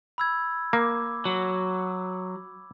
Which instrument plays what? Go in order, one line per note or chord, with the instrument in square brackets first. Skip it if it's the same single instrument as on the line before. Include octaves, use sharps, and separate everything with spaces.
[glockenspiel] B5 E6 G#6
[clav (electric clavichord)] A#3 [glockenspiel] D6
[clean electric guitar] F#3